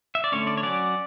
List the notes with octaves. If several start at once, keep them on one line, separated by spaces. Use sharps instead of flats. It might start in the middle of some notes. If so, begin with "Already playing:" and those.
E5
D5
D3 A3 C#4 C#5
D5
C#5
F#3 C#4 D5